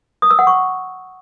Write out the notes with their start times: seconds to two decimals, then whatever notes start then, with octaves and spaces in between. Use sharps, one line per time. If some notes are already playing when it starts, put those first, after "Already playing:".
0.22 D#6
0.31 E6
0.39 F#5
0.47 C#6